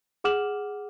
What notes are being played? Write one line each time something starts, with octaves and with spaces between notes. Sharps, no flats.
G#4 F#5 D6 F6 E7 F#7